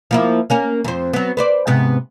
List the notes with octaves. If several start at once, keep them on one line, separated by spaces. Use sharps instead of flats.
F3 A#3 E4
A#3 C#4 A#4
F2 C5
F#3 B3
B4 C5 D5
G#2 C3 B3